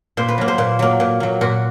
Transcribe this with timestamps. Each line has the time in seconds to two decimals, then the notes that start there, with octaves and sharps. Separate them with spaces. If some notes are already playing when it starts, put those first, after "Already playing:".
0.17 A#2 C5
0.28 B4
0.38 F#3 A#3
0.48 C5
0.58 A#2
0.79 F#3 A#3
1.00 A#2
1.20 F#3 A#3
1.41 A#2 F#4